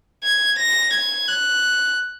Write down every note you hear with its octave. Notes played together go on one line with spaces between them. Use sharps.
G#6
A#6
G#6
F#6